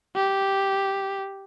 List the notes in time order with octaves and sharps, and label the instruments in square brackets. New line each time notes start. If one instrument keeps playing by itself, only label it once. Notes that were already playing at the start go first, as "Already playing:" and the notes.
[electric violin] G4